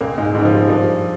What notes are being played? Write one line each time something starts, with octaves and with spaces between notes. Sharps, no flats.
C#2 A#2 A#3
G#2 G#3
G#2 C#3 G#3
F3
G3
G2 F3